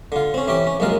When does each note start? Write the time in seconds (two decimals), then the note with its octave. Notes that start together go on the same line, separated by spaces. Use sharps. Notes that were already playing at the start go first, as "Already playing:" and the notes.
0.12 D3 F4
0.34 C4 C#4
0.48 E3 C#4 G4 G5
0.67 C#4
0.80 A#1 F#2 G#3 F4 A#4